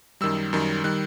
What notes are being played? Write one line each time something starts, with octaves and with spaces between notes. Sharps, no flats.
F#2 D#3 G3 E6
F#2 D#3 G3
D#3 G3 F#6